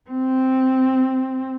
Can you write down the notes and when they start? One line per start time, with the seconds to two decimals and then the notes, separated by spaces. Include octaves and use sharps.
0.11 C4